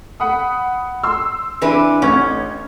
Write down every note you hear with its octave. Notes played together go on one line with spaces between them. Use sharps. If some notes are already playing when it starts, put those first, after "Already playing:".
F#5 B5 D#6
C6 E6
E3 D4 B4
A1 C#4 G#6